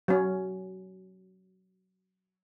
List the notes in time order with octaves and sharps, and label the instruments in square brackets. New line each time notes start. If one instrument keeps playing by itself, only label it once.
[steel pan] F#3 C#4